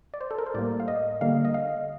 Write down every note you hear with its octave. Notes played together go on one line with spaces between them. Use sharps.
D5
C5
A4
A#4
C5
A2 G3 A#3 D5
F5
D#5
D3 G3 A#3 F5
D#5
F5